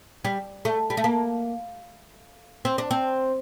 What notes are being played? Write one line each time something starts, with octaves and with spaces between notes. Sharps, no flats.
G3
A3
G3
A3
A#3
C4
D4
C4